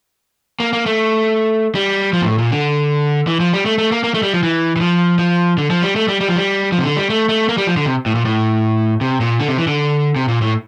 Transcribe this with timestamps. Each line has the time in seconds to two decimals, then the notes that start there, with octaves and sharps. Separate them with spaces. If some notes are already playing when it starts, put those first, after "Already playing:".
0.60 A#3
0.73 A#3
0.86 A3
1.75 G3
2.13 F3
2.22 A#2
2.26 A2
2.38 A#2
2.51 D3
3.27 E3
3.40 F3
3.53 G3
3.66 A3
3.78 A3
3.92 A#3
4.04 A#3
4.14 A3
4.23 G3
4.33 F3
4.43 E3
4.76 E3
4.81 F3
5.19 F3
5.58 D3
5.70 F3
5.82 G3
5.96 A3
6.08 G3
6.21 G3
6.29 F3
6.36 G3
6.72 F3
6.79 C3
6.84 D3
6.97 G3
7.10 A3
7.29 A3
7.49 A#3
7.58 G3
7.67 F3
7.77 D3
7.86 C3
8.06 A2
8.15 A#2
8.25 A2
9.01 C3
9.20 A#2
9.39 D3
9.48 C3
9.58 E3
9.67 D3
10.16 C3
10.28 A#2
10.41 A2